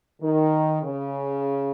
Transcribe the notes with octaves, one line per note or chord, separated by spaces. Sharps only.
D#3
C#3